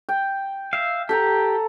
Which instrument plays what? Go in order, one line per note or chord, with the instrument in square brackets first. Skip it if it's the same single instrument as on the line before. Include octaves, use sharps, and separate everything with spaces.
[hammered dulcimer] G5
[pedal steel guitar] E5 F5
[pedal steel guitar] G4 [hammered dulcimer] A4 F#5 A#5